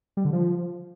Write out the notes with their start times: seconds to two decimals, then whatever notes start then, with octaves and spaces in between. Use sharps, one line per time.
0.17 G3
0.25 D3
0.33 F3